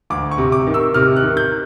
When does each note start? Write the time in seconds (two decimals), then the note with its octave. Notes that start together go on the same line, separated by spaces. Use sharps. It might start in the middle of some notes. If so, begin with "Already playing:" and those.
0.10 D2 D6
0.31 C#6
0.38 C3
0.52 D6
0.67 D#3
0.74 E6
0.94 C3 F6
1.16 F#6
1.22 D#3
1.37 G6